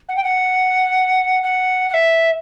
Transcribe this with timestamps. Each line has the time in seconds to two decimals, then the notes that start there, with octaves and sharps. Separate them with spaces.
0.08 F#5
0.16 G5
0.23 F#5
1.43 F#5
1.89 F#5
1.93 E5